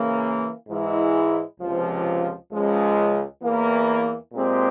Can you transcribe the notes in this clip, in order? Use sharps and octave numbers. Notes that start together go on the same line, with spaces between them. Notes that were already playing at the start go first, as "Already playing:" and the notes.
Already playing: C#3 E3 A#3
G#2 E3 G#3 E4
C#2 C3 F3
C#2 C#3 F3 G#3
E2 E3 A#3
A#2 G#3 C4 G4